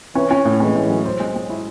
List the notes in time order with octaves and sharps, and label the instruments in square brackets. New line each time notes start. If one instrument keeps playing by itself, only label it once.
[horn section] E3 [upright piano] C#4
[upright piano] C#4
A2
[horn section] E3 G#3 [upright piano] C#4
[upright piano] A2
F#3
C5
G#3
G#3
E4